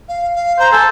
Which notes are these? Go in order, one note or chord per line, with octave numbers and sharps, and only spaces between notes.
F5
F5
C5 A#5
A4 G#5